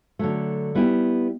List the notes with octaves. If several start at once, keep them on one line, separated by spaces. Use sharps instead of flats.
D3 F#3 A3
G3 B3 E4 G4